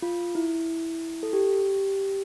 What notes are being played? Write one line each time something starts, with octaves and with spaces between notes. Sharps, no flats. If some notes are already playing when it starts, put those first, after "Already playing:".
F4
E4
A4
G4